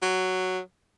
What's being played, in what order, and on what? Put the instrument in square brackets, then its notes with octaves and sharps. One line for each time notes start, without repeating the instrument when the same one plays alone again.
[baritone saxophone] F#3